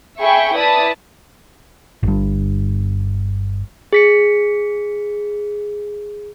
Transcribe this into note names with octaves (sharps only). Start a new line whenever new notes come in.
G#4 E5 G5 B5 C#6
E4 B4 D5 A5 D#6 B6
G1 G2
G#4 B6 C#7